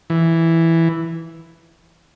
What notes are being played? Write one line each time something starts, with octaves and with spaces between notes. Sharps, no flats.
E3